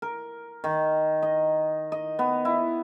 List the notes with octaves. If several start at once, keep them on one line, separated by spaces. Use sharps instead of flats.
A#4
D#3
D#5
D#5
B3
E4